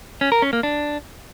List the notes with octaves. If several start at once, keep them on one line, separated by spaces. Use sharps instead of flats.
C#4
A#4
C#4
A#3
D4